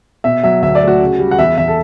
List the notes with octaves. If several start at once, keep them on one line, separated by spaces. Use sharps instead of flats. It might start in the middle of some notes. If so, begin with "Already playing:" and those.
B2 E5
F#3 E5
D2 E5
D5
A3
F#4
C#3
G3
F#5
E2 E5
E2 E5
A4